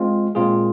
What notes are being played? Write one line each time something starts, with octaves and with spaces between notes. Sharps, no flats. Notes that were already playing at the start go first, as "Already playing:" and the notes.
Already playing: G#3 C4 F4
A#2 G#3 C4 F4 G#4